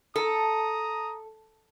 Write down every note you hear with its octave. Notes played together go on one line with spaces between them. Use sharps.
A4 A#5 D#6